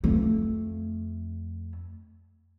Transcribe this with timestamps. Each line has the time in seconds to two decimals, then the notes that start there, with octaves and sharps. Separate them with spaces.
0.04 F2 A3